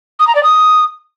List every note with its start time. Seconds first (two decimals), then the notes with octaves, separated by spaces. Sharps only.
0.19 D#6
0.27 A#5
0.35 D5
0.43 D#6